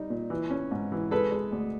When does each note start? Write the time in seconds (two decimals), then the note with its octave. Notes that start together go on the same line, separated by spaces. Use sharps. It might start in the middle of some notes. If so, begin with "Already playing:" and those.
Already playing: G3 D#4
0.10 A#2
0.30 E3
0.50 C#4
0.71 G#2
0.92 E3
1.11 G#3 A4 B4
1.31 G#3
1.52 D2